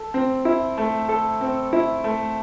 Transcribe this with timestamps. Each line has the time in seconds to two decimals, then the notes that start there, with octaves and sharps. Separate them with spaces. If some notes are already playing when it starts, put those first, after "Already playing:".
Already playing: A4
0.14 C4
0.45 E4
0.78 A3
1.09 A4
1.41 C4
1.73 E4
2.04 A3